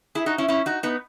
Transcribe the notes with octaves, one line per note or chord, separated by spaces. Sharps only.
E4 G#4
D#4 F#4
C#4 E4
C#4 E4
D#4 F#4
B3 D#4